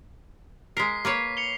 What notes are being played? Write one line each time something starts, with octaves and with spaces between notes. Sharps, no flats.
G#3 A#4 B6 C7
A#3 B4 C#5
C#7 F7 G7